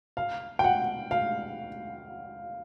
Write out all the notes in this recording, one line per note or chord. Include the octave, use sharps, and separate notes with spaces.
F5
G5
F#5
F5